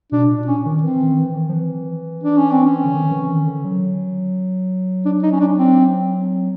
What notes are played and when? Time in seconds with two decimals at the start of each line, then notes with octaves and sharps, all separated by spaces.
0.12 B2 D4
0.30 A#2
0.47 C#4
0.66 D#3
0.83 E3 C4
1.01 D#3
1.19 E3
1.36 D#3
1.49 F3
1.54 E3
2.24 D4
2.38 C#4
2.51 C4
2.65 C#4
2.84 D3
2.94 D#3
3.11 E3
3.29 D#3
3.46 D3
3.65 F#3
5.06 D4
5.23 D#4
5.32 C#4
5.40 D4
5.58 C4